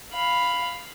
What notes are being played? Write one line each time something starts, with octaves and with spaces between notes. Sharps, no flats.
F5 B5